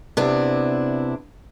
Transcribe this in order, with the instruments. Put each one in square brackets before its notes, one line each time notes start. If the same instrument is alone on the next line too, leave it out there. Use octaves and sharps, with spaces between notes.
[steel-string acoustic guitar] C3 B3 D4 E4